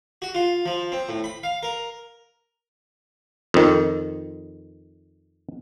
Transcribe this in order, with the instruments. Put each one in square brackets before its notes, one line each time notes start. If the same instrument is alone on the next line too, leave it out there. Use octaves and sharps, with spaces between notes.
[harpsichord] F#4
F4
F3
C4
A2
B5
F5
A#4
[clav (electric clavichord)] F2 D#3